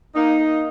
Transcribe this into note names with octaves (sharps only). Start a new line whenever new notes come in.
A#3 D#4
A#3